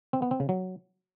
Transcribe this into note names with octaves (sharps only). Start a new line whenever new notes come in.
C4
B3
C4
C#3
F#3